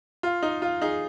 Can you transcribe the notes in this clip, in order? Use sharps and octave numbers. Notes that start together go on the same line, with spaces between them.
F4
D#4
F4
D#4 G#4